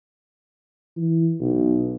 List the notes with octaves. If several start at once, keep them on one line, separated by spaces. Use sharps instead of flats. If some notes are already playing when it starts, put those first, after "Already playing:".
E3
B1